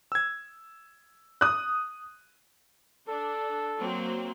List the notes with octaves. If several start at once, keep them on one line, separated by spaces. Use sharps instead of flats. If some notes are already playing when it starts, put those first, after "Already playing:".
E6 G#6
D#6 F#6
D4 A4
F#3 A#3 C4